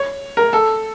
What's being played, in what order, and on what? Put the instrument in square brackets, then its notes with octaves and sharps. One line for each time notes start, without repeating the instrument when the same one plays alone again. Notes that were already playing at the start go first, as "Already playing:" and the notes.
Already playing: [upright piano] C#5
A#4
A4